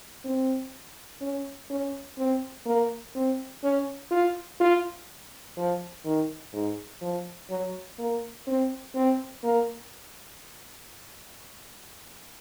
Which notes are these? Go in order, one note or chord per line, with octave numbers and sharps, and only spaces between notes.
C4
C#4
C#4
C4
A#3
C4
C#4
F4
F4
F3
D#3
G#2
F3
F#3
A#3
C4
C4
A#3